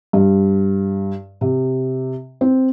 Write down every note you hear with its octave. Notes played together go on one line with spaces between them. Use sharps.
G2
C3
C4